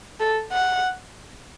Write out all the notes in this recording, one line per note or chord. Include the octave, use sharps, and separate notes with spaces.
A4
F#5